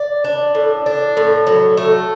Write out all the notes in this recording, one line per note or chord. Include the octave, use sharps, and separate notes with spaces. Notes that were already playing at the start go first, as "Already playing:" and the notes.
Already playing: D5
D4
A2
D4
A2
F#3
A3